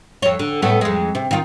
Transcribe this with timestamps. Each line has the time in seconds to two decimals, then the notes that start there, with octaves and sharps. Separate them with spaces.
0.22 F2 C#5
0.39 D3
0.62 A2 A3 B3
0.81 F2 G#3
1.15 C3
1.31 D#3 F4